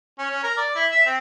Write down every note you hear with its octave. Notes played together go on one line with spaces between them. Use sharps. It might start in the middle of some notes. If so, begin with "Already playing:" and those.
C#4
C#4
A#4
D5
E4
E5
C4